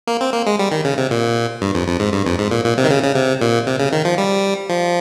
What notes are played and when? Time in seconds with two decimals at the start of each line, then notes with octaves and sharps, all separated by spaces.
0.07 A#3
0.21 C4
0.33 A#3
0.46 G#3
0.59 G3
0.72 D#3
0.85 C#3
0.98 C3
1.11 A#2
1.62 G2
1.75 F2
1.88 F2
2.00 G#2
2.13 G2
2.26 F2
2.39 G#2
2.51 A#2
2.64 A#2
2.78 C3
2.84 D#3
2.90 C#3
3.03 C#3
3.15 C3
3.41 A#2
3.67 C3
3.80 C#3
3.93 D#3
4.05 F3
4.18 G3
4.69 F3